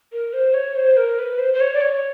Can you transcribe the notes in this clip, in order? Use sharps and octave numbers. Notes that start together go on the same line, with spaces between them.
A#4
C5
C#5
C5
A#4
B4
C5
C5
C#5
D5
C#5